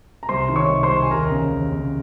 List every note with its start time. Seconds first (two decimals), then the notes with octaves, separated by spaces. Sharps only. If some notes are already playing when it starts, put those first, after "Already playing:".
0.23 A#5
0.29 C2 C5 C6
0.49 D#3
0.56 C#5 C#6
0.69 C2
0.83 C5 C6
0.91 C2
1.02 G#5
1.11 D#2 A#4 A#5
1.31 C#3
1.52 D#2
1.72 C#3